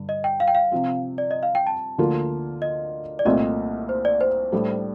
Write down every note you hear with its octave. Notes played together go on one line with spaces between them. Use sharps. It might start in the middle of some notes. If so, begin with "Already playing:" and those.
Already playing: G2 D3 G3
D#5
G5
F5
G5
F5
C3 F3 C4
D5
D#5
F5
G5
A5
D2 D3 F3 A#3 F4
D#5
D5
C2 A#2 A3 C4 F4 D#5
C5
D5
C5
A2 G3 D4 A4